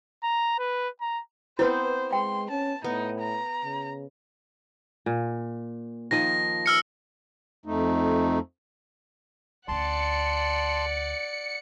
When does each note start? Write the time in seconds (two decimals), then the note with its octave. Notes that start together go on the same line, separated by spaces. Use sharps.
0.23 A#5
0.59 B4
1.01 A#5
1.59 B3 C4 E4 B4 C5
2.13 G#3 G5 C6
2.50 C#4 A5
2.84 A2 B3 D#4
3.20 A#5
3.65 C#3
5.06 A#2
6.11 D#3 F3 D#5 A#6
6.66 E6 F6 C#7
7.66 F2 A3 D#4
9.68 D2 C#4 D5 F#5 A5 C6 C#7